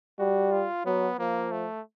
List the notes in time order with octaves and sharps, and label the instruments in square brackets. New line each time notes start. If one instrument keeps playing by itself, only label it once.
[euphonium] G3 [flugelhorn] F#4
[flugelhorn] F4
[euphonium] F#3 [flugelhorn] B3
[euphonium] F3 [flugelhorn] A#3
[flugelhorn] A3